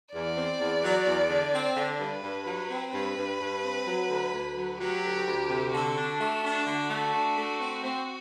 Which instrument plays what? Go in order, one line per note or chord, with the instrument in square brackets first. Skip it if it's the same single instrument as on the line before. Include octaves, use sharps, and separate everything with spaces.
[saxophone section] E2 [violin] D5
[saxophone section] C4
E2
F#3
E2
D3
C4
D3
[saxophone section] G2 [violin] B4
[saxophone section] G2
F#3
C4
[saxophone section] G2 [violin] B4
[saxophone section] G2
G2
C4
F#3
D2
D2
F#3
[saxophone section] F#3 [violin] G4
[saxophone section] D2
D2
C3
[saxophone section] D3 [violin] F#4
[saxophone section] D4
A3
D4
D3
A3
D4
A3
C4
C4